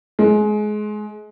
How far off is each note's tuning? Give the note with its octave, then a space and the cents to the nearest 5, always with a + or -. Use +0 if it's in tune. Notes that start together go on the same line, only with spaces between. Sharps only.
G#3 +25